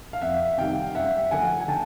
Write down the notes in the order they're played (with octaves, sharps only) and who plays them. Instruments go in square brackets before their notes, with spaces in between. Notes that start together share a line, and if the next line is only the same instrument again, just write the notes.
[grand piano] F5
F2 E5 F#5
C3 D#3 G3 F5 G5
F#2 E5 F#5
D3 F3 A3 F#5 G#5
G#5
D3 G5 A5